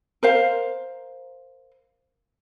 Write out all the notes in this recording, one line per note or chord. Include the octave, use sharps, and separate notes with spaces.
A#4 C5 F5